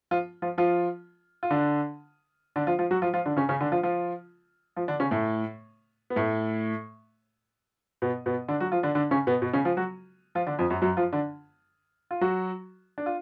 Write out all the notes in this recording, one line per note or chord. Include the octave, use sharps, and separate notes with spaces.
F3 F4
F3 F4
F3 F4
F4
D3 D4
D3 D4
F3 F4
F3 F4
F#3 F#4
F3 F4
F3 F4
D3 D4
C#3 C#4
C#3 C#4
D3 D4
F3 F4
F3 F4
F3 F4
D3 D4
C#3 C#4
A2 A3
B3
A2 A3
B2 B3
B2 B3
D3 D4
F#3 F#4
F3 F4
D3 D4
D3 D4
C#3 C#4
B2 B3
B2 B3
C#3 C#4
F3 F4
F#3 F#4
F3 F4
D3 D4
F2 F3
F#2 F#3
F#2 F#3
F3 F4
D3 D4
F4
F#3 F#4
D4
F4